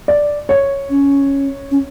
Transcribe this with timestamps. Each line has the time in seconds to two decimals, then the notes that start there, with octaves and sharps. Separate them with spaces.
0.08 D5
0.49 C#5
0.90 C#4
1.71 C#4